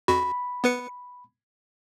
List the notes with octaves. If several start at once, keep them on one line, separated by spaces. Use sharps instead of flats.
F2 F#4 B5
B3 B4 C#7